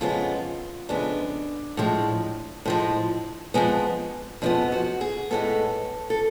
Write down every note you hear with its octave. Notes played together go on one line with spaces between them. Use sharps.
F2 C#3 G#3 B3 F4
F2 C#3 G#3 B3 D4
A2 F3 G#3
A2 F3 G#3
F2 F3 G#3 B3
F2 F3 G#3 B3 D4
F#4
G#4
A2 G#3 B3 A4
A4